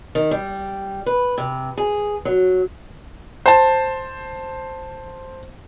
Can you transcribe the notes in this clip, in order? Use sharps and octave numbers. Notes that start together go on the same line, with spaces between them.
D#3
G3
B4
C3
G#4
F#3
C5 A5